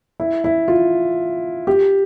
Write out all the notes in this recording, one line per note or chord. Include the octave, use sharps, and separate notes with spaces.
E4
E4
F4
G4